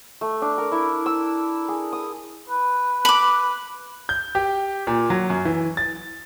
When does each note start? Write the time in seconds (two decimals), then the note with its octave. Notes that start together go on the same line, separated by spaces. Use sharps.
0.21 A3
0.42 D4
0.58 A#4
0.72 E4
1.06 E6
1.68 G#4
1.93 D#6
2.50 B4
3.05 B5 D6
4.09 G6
4.35 G4
4.87 A#2
5.10 F#3
5.30 F#2
5.45 E3
5.77 A6